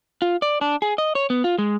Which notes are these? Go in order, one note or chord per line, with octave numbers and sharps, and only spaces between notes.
F4
D5
D4
G#4
D#5
C#5
B3
F4
G#3